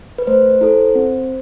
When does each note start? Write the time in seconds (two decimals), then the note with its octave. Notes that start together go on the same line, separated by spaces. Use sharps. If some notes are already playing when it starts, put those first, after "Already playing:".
0.18 B4
0.27 A3 C5
0.61 E4 A4
0.95 C4